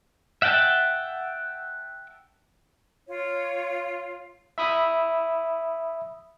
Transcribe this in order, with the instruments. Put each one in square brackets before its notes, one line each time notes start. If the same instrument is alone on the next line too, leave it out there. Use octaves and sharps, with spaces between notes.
[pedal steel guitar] E5 F#5 G5 A5
[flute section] F4 C#5 F5
[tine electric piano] E5 B5 D#6